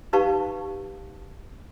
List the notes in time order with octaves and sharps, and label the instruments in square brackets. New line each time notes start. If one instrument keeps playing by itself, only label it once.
[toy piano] D#4 G4 B4 F5 A5 C#6